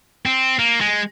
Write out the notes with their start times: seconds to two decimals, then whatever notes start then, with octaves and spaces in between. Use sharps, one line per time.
0.26 C4
0.59 A#3
0.81 G#3